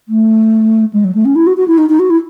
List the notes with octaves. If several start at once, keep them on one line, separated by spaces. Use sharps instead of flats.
A3
G#3
F#3
A3
C#4
E4
F#4
F#4
E4
D#4
D#4
F#4
E4